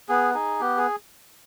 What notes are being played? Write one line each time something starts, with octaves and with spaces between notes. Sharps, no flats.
B3 G#4
D#4 G#4
B3 G4
G#4